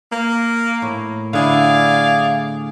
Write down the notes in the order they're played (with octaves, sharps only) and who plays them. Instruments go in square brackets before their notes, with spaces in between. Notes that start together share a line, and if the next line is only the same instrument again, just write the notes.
[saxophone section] A#3
[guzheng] A2
[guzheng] D3 E4 [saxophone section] G#4 D5 F5